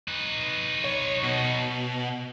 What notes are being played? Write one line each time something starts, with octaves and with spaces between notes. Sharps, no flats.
D#4 B4
C#5
B2